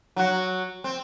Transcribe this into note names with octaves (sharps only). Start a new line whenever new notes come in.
F#3 F#4
C4